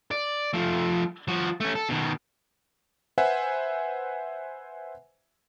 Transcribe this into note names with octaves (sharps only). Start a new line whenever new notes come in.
D5
F3 A3
F3 F#4
A3 C#4
A4
B2 D#3
B4 C5 E5 F#5 G#5